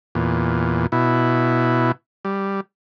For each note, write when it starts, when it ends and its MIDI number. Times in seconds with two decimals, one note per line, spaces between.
0.15 0.86 40
0.15 0.86 46
0.92 1.92 47
0.92 1.92 64
2.25 2.61 55